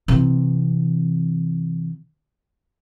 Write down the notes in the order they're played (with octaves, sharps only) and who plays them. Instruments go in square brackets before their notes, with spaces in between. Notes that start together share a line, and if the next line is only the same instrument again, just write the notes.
[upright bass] C3 E3